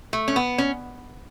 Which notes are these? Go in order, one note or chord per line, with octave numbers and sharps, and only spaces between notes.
A3
C#4
B3
C#4